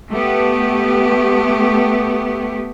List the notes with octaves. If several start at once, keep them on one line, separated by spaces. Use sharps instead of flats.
A3 B3 G4